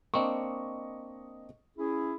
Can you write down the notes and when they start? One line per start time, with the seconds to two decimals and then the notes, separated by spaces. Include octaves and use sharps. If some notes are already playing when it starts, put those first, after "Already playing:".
0.14 A#3 C4 D4 D#5 C#6
1.77 C#4 E4 G#4